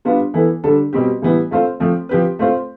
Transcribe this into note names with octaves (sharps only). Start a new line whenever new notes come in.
G3 B3 D4 F4
E3 B3 E4 A4
D3 G3 D4 A4
B2 G3 C4 G4
A2 E3 G3 B3 E4
A3 C4 F4 A4 C5
F3 A3 C4
F3 C4 G4 B4
A3 C4 F4 C5